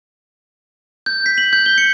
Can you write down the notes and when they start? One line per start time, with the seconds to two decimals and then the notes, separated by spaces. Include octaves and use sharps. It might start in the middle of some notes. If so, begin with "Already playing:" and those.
1.06 G6
1.26 B6
1.38 F#7
1.53 G6
1.66 G7
1.78 C#7